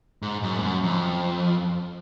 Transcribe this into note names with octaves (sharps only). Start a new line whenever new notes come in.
G#2
F#2
G#2
F#2
F2